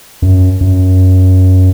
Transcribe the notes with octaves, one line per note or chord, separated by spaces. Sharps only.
F#2
F#2